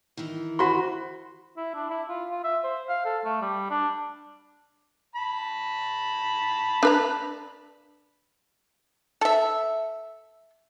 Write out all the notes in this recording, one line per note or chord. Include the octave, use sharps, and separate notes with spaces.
D#3 E3
F#4 C5 B5 C6
E4
D4
E4
F4
F4
E5
C5
F5
A4
A3
G3
D4
A5 B5
D4 B4 A#5
A4 E5